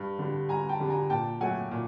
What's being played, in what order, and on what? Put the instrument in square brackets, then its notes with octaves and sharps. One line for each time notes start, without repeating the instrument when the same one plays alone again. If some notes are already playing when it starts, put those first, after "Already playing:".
Already playing: [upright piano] G2
D3 G3
G2 G#5 A#5
G5 A5
D3 G3
G#5 A#5
A#2 G5 A5
F#3 A3 F#5 G#5
A#2